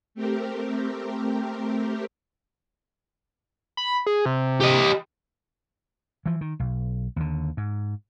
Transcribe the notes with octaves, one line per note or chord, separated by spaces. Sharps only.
A3 C4 G4 A#4
B5
G#4
C3
G4 D#5
E3 F3
D#3
B1
D#2 D3
G#2